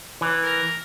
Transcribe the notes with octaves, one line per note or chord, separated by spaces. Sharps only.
E3
A#4